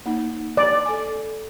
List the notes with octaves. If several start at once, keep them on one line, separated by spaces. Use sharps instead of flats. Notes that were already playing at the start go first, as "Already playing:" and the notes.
A#3 D#4
D5
A4 G#5